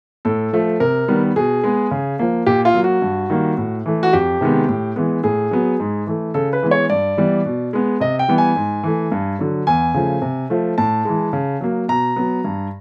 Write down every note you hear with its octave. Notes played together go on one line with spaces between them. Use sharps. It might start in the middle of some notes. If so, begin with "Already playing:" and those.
A2 A4
F3 A3
C3 A#4
D#3 G3 B3
B2 G#4
G#3 B3
C#3
F3 A#3
A#2 G4
F4
F#3 A#3
F#4
G2
D#3 G3 A#3
A2
E3 A3
F#4
F2 G4
C3 D#3 G#3 B3
A2
E3 G#3 B3
A2 G#4
F#3 B3
G#2
E3 A3
C#3 A4
B4
E3 G#3 B3
C#5
G2 D5
E3 G3 B3
B2
G#3 B3
C3 D#5
G5
E3 G3 B3
G#5
G#2
E3 A3
G2
D3 F#3
E2 G#5
C#3 F3 A3
C3
F3 A3
A2 A5
E3 G#3
C#3
F#3 A#3
B2 A#5
F#3 B3
G2